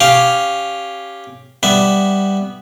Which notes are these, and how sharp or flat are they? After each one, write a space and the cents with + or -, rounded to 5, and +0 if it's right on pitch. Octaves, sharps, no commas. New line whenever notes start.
C#4 -10 G4 +0 F5 +0
G3 +0 B3 +0 E5 +0